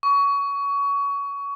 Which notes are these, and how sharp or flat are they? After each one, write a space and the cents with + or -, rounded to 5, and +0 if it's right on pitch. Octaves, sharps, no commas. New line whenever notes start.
C#6 +25